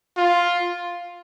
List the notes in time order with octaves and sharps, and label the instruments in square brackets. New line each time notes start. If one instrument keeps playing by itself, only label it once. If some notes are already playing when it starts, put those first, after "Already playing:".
[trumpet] F4